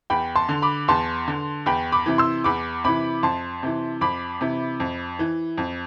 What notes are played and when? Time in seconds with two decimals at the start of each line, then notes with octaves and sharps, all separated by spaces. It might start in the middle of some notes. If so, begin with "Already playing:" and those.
0.10 E2 G5 B5
0.36 A5 C6
0.49 D3
0.62 B5 D6
0.88 E2 A5 C6
1.27 D3
1.66 E2 G5 B5
1.92 B5 D6
2.06 C3 E3
2.18 C6 E6
2.44 E2 B5 D6
2.84 C3 E3 B5 D6
3.23 F2 A5 C6
3.63 C3 E3
4.01 F2 B5 D6
4.41 C3 E3
4.80 F2
5.19 E3
5.58 F2